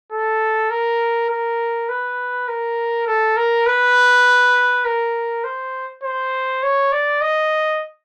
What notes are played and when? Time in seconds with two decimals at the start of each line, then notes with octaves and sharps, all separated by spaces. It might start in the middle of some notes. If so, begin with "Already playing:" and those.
0.12 A4
0.70 A#4
1.30 A#4
1.89 B4
2.48 A#4
3.07 A4
3.36 A#4
3.67 B4
4.85 A#4
5.44 C5
6.03 C5
6.63 C#5
6.92 D5
7.22 D#5